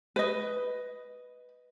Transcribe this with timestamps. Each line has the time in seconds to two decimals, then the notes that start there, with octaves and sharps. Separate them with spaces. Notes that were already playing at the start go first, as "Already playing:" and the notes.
0.16 B4 D#5